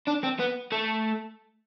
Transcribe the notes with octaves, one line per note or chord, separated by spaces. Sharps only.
D4
C4
B3
A3